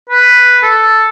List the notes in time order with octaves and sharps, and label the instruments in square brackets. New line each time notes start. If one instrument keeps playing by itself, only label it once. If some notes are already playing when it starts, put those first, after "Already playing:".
[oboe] B4
A4